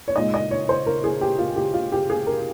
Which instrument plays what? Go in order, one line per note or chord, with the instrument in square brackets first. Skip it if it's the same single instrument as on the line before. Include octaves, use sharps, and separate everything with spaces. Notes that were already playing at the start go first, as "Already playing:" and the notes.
[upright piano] C#5
A#2 G#3 D#4 D#5
D#5
C#5
C5
A#4
G#4
G4
F4
G4
F4
G4
G#4
A#4